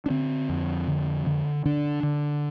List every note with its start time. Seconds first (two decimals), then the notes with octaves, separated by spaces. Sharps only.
0.06 D4
0.10 D3 C4
0.49 F2
0.87 D3
1.26 D3
1.65 D3 D4
2.03 D3